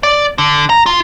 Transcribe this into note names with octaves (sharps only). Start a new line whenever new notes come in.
D5
D3
A#5
F4